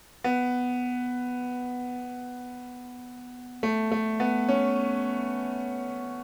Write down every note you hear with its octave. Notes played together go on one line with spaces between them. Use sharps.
B3
A3
A3
B3
C#4